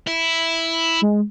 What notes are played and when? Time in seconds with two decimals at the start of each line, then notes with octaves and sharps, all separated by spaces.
0.07 E4
1.02 G#3